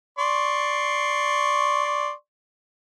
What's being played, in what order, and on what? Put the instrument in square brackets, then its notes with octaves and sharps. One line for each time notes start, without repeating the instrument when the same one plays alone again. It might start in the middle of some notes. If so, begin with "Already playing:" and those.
[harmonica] D5 C6 C#6